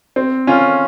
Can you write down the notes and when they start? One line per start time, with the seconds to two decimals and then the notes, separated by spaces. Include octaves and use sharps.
0.16 C4
0.47 C#4 F4